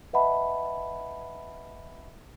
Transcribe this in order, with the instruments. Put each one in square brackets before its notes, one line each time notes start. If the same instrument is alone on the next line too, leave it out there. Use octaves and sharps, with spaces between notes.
[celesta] B4 D#5 E5 F#5 A5 B5